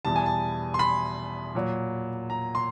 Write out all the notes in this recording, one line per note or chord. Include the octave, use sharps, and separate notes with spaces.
E2 B2 G3 A5
G#5
A5
C6
B5
A#2 F#3
A#5
C6